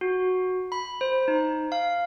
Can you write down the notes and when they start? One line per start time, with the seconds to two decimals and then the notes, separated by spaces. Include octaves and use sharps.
0.01 F#4
0.72 B5
1.01 C5
1.28 D#4
1.72 F5